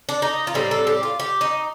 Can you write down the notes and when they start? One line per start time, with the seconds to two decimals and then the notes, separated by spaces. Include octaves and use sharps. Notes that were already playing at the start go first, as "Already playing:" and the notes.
0.09 D4
0.22 D#4
0.47 F4
0.54 A2 G3 C4 D#4
0.71 A4
0.87 G4
1.03 F4
1.20 G4
1.41 D#4